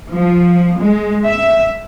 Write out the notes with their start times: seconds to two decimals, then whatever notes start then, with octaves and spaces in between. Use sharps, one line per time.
0.11 F3
0.81 G#3
1.25 E5